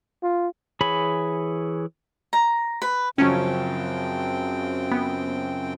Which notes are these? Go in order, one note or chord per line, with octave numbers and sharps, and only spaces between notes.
F4
E3 G#4 C#5 B5
A#5
B4
F#2 C#3 F3 F#3 C4 C#4 G5
B3